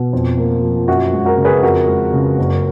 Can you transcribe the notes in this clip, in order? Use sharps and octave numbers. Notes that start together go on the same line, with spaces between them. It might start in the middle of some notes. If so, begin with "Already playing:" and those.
Already playing: B2
F2
A#3
F3
F#2 F#4
G#3
F#4 A#4
C#3
G#4 B4
F2 F#4 A#4
G#3
C#3
F#1